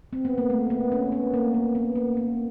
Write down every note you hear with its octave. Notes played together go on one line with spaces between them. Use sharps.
C4
B3
A#3
A3
B3
C#4
B3
A#3
A#3
B3
A#3
B3